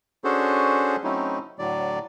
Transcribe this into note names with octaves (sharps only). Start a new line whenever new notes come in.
C#4 D4 F#4 G#4 A4 C5
F#3 A3 C4 C#4 D#4 E4
A2 D3 F#3 D5